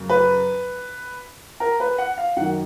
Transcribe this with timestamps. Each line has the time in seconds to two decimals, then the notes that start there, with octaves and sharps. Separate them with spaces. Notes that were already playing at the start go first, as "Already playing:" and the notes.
Already playing: F#2 C#3
0.09 B4
1.60 A#4
1.80 B4
1.98 F#5
2.18 F5
2.36 F#2 D#3 F#5